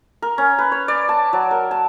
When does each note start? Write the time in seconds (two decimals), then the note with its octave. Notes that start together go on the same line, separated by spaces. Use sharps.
0.22 A#4
0.38 C#4
0.58 B4
0.72 C#5
0.88 D5
1.09 A5
1.33 F#3
1.51 A#4
1.71 A5